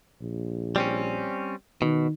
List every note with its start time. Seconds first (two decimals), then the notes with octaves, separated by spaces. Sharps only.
0.21 A#1
0.76 G3 C4 C#4
1.82 B2 D#3